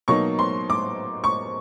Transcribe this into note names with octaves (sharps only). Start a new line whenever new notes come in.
B2 F#3 A#3 D#4 C#6
C6
D6
C#6